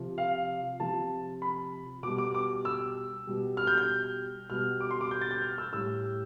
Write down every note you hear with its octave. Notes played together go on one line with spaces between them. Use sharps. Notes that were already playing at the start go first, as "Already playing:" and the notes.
Already playing: C3 F3
F5
C3 F3 A5
B5
B2 G3 D6
D6
D6
E6
B2 G3
F6
G6
G6
B2 G3 F6
D6
C6
D6
G6
A6
G6
F6
E6
A2 G3 E6